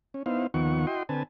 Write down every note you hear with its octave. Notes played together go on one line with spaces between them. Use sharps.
C#4
B3 D#4 E4 C5 F5
D#2 D#3 F3 B3 F#5 C#6
E4 F#4 D#5 G5 C6
D3 C4 B4 G#5 A5